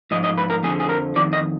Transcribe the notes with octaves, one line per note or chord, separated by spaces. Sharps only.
G#2 F3 D#5
D#5
B4
A#4
F2 D3 F3 G#4
G#4
A#4
F2 D#3 D5
D#5